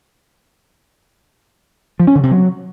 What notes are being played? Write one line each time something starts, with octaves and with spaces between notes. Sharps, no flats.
F3
C#4
D3
C3
F#3